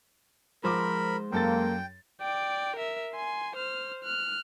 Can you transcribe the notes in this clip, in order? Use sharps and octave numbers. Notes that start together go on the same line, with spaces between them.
F3 G#3 A#4 C5 B5 D6
F#2 A#3 A4 G5 A6
D5 G5
A#4 E5
G#5 C6
C5 F6
F6 F#6